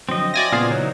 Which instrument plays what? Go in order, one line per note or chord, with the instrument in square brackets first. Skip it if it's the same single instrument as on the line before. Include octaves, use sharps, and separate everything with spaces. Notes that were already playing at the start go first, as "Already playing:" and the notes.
[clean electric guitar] F2 D3 F#3 [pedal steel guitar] C4 D#5
[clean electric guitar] F#4 E5 F5 [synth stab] D5 G#5 A#6
[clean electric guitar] C#2 C#4 [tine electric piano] A#2 B3 [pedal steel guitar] F4 G#4 C5
[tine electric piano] C#3 [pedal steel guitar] E3 F#3 D#4 [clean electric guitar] C#5